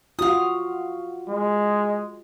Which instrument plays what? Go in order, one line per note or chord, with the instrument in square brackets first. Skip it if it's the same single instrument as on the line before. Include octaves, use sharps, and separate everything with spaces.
[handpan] F4 F#4 [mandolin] F5 D#6
[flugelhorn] G#3